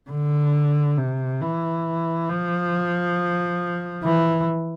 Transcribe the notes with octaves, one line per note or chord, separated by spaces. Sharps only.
D3
C3
E3
F3
E3